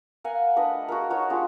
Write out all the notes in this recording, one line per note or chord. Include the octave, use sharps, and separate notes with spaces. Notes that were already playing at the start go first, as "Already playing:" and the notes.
A#4 F5 F#5 G#5
A3 D4 B4 D#5
F#4 G#4 A#4
D#4 F#4 A#4 C#5
G#3 D4 F4 G4